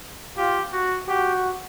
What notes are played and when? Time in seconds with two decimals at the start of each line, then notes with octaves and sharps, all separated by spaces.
0.38 F4 G4
0.72 F#4
1.08 F#4 G4